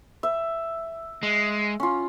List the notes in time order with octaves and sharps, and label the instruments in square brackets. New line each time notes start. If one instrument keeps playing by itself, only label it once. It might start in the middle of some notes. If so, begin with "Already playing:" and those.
[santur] E5
[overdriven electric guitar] G#3
[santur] C#4 F4